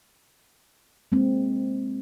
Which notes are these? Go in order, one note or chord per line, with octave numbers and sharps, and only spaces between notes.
G#3 A#3 C4